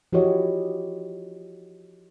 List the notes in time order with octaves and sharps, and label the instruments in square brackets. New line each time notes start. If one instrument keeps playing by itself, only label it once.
[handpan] F3 E4 F#4 G4 C#5 D#5